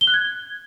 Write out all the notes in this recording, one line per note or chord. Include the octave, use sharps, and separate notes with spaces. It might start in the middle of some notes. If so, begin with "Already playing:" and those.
G7
F#6
G#6